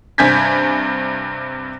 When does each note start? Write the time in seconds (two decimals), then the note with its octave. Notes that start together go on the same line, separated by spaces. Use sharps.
0.18 G2 C3 G#5 G6 G#6 B6